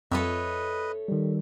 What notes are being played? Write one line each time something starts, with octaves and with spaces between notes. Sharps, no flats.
F2 A4 B4 C#5 D#5 E5
D#3 G3